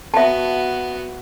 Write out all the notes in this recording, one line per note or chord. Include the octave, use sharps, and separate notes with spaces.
B3 F#4 E5 A5